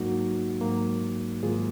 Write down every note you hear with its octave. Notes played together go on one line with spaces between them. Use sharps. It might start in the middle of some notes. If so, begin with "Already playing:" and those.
Already playing: G#2 F#3 A#3 D#4 F#4
G#2 F#3 A#3
G#2 D#3 F#3 A#3 F4 G#4